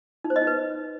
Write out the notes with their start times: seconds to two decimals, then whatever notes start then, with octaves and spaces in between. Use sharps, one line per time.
0.24 D#4
0.30 C5
0.36 D#5
0.41 D#4
0.47 B4